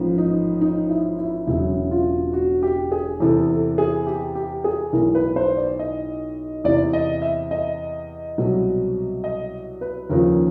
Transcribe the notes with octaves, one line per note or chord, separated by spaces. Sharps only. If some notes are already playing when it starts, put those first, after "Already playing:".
Already playing: A1 G#2 F3
D#4
D#4
E4
E4
E1 E2 C#3 F#3 E4
F4
F#4
G4
G#4
E2 C3 E3 A4
A4
G#4
G4
G4
G#4
B1 A2 E3 A#4
B4
C5
D5
D#5
E2 C3 E3 D5
D#5
E5
D#5
C2 B2 F#3
D#5
B4
D#2 C#3 F3 A#4